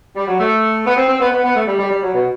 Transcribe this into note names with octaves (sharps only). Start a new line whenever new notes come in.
G3
F#3
A3
B3
C4
C4
B3
B3
B3
A3
G3
G3
G3
F#3
B2